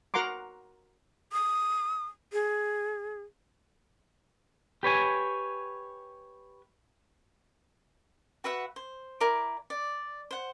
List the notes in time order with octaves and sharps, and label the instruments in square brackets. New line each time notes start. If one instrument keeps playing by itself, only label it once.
[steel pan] F#4 A#4 F#5 A#5 C6 D6
[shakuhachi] D#6
G#4
[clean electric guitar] G4 B4 C#5 G#5
[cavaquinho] F#4 B4 E5 F#5
C5
E4 A#4 D5 D6
D5
C5 F#5